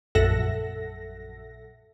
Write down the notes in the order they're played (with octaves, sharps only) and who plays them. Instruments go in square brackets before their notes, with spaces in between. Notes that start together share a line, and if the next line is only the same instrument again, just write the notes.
[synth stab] A#1 F#2 A4 E5 F#5 A#6